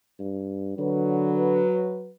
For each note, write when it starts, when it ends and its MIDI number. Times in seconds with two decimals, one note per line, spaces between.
0.20 0.73 43
0.78 1.62 50
0.78 2.15 54
0.78 2.15 71